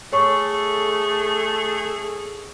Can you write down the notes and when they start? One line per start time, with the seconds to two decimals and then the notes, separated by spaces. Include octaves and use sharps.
0.12 A3 G#4 A4 C#5 C#6